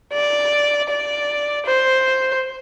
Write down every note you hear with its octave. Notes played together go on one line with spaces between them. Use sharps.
D5
D5
C5